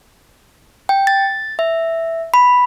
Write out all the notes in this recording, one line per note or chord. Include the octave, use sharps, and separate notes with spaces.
G5
A6
E5
B5